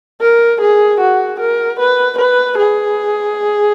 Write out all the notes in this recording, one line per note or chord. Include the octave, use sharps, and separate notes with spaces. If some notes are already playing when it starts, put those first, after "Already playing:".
A#4
G#4
F#4
A#4
B4
B4
G#4